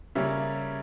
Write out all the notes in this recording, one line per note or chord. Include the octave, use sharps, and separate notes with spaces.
C#3 G3 A#3 C#4 E5